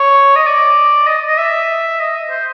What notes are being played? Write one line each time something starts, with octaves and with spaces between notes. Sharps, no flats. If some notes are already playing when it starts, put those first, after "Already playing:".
Already playing: C#5
D#5
D5
D#5
D#5
E5
D#5
C5